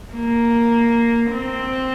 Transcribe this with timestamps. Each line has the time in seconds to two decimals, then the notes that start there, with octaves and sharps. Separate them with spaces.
0.13 A#3
1.31 C4